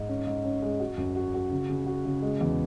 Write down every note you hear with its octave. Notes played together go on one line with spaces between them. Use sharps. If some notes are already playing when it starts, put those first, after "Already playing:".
Already playing: G#2
C#4
G#2
C#4
G#3
F#4
F#2
F#4
F#4
C#3
C#3
F#4
C#3
G#3
E2